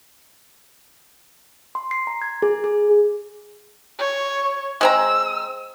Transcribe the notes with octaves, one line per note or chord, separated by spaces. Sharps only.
C6
C7
A#5
G#6
G#4
G#4
C#5
G#3 C4 A#5 E6